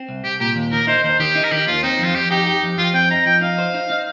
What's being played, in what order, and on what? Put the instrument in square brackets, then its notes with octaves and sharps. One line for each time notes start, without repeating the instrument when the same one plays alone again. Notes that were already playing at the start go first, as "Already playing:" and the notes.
Already playing: [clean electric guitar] C4
C2
[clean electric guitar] C2 [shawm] G4
[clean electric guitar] A#2 [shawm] G4
[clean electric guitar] D#2
[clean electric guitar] D#3 [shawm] A#4
[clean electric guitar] D#4 [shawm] C5
[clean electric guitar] D#2 [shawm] C5
[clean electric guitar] D#3 [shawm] G4
[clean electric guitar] D#4
[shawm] A#4
[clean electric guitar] D#3 [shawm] G4
[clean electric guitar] D#2 [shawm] F4
[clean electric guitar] C4 [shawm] D#4
[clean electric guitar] F2 [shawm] F4
[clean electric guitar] F2 [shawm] G4
[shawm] D#4 [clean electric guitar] G4
[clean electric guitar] G4
F2
[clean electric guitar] F2 [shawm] F4
[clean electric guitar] C4 [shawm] G5
[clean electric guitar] D#4 [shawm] A#5
[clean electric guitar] F3 [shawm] G5
[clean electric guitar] D#4 [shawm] F5
[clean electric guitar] C5
D#4
D#4